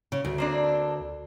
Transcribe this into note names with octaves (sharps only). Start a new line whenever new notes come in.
C#3
D2
A#3 C4 D4